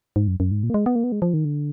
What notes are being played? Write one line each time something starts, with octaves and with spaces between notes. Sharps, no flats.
G#2
F#2
F#2
G#2
A#2
A#3
G#3
B3
A#3
B3
G#3
F3
D#3
D3